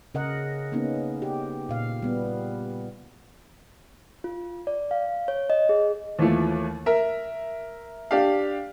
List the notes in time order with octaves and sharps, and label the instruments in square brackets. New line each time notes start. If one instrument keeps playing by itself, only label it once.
[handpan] C#3 A#4 D#5 F#5
A#3 B3 C#4 D#4
G4
A#2 F5
G3 B3
[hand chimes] F4
D5
F5
C#5
D#5
G#4
[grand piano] D#2 E3 F3 A3
A#4 E5
D4 G4 F5